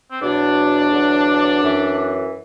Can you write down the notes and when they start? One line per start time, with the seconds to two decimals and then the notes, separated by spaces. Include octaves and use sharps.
0.10 C4
0.21 E2 B2 F#3 D4
0.91 E2 D3 F#3
1.63 F#2 E3